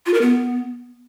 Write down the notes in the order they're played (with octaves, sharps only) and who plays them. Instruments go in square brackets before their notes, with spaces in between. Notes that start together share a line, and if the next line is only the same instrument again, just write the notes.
[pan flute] F4
A#4
B3